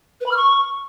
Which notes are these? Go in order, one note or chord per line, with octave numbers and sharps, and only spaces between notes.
B4
B5
F6
C#6